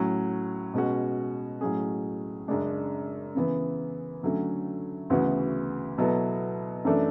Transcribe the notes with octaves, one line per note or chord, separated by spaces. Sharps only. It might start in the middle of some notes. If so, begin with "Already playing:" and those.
Already playing: A2 F#3 C#4
B2 G#3 C#4 F#4
A2 F#3 C#4 G#4
F#2 C#3 G#3 D4
C#3 E3 B3
D3 F#3 A3 C#4
D2 C#3 E3 B3 F#4
B2 F#3 B3 E4 A4
F#2 E3 A3 D4 A4